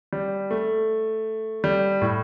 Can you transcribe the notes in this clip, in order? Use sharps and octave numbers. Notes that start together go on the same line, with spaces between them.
G3
A3
G3
A2